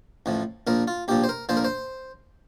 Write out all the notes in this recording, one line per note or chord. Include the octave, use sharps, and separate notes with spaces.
A1 A2 F3
A#1 A#2 F3 A#4
F4
A#1 A#2 F3 G4
C5
A#4
A#1 A#2 F3 C5
A#4
C5